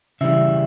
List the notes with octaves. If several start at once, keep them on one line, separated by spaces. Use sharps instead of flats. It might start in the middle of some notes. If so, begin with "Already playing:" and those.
C#3 E3 G3 E5